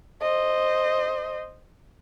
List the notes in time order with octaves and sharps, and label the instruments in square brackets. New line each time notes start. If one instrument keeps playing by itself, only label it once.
[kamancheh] C5 D#5